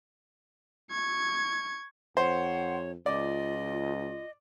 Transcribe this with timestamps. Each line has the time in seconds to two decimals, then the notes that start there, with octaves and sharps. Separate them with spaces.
0.91 C#6 G#6
2.17 F2 C5 C#5 F#5
3.06 C#2 F4 D5 D#5